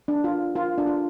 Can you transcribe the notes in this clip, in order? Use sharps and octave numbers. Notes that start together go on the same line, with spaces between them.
D4
F4
F4
D4
F4